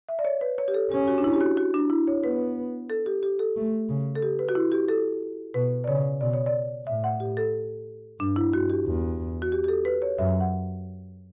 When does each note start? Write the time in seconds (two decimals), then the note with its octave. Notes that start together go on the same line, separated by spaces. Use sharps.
0.09 E5
0.19 D5
0.25 C#5
0.41 B4
0.58 C#5
0.68 G4
0.74 A4
0.91 C#4 G4
1.08 F#4
1.18 D4
1.24 E4
1.33 G4
1.41 F#4
1.57 F#4
1.74 D4
1.90 E4
2.08 C#5
2.23 B3 B4
2.90 A4
3.06 G4
3.23 G4
3.39 A4
3.56 A3
3.89 C#3
4.15 A4
4.22 G4
4.39 B4
4.49 F#4
4.55 E4
4.72 G4
4.88 A4
5.54 B2 B4
5.84 D5
5.88 C#3 C#5
6.21 B2 D5
6.34 C#5
6.46 D5
6.87 A2 E5
7.04 F#5
7.20 G4
7.37 A4
8.20 G2 D4
8.36 E4
8.52 G2 F#4
8.70 G4
8.86 E2
9.42 F#4
9.52 G4
9.64 G4
9.68 A4
9.85 B4
10.02 C#5
10.18 F#2 E5
10.40 F#5